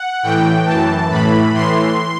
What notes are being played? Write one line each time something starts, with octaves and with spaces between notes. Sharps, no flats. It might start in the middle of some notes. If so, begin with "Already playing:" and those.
Already playing: F#5
A2 E3 G5
F#2 E3 A5
A2 E3 B5
A2 E3 C6